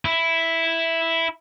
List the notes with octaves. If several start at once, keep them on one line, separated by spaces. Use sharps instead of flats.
E4